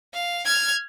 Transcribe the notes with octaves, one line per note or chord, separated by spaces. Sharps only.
F5
F6 G#6